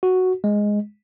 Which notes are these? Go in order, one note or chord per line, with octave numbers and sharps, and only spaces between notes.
F#4
G#3